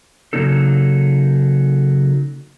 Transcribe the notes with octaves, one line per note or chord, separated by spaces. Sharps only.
C#3 F#3 A#3 D#4 A4